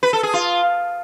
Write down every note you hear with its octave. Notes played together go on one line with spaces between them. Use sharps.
B4
A4
G#4
F4